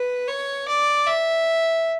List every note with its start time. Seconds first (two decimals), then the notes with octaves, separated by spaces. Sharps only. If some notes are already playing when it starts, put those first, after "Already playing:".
Already playing: B4
0.28 C#5
0.68 D5
1.07 E5